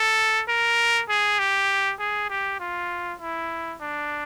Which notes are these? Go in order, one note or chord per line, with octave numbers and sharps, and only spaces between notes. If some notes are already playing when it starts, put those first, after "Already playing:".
Already playing: A4
A#4
G#4
G4
G#4
G4
F4
E4
D4